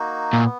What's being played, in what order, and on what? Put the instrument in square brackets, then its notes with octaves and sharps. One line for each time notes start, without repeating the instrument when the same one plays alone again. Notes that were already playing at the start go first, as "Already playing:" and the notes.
Already playing: [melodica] A#3 D#4 F#4
[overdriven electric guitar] A#2
[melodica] B3